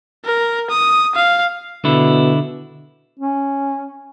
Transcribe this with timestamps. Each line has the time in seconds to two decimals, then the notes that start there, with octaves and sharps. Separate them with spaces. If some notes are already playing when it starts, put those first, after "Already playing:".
0.25 A#4
0.70 D#6
1.15 F5
1.85 B2 D3 E4
3.19 C#4